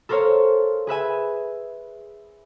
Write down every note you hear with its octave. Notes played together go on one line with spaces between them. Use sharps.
A4 A#4 C5 C#5 F5
G#4 B4 E5 G#5